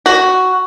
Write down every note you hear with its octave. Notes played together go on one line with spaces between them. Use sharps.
F#4